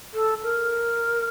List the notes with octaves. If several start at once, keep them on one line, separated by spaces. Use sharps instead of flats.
A4
A#4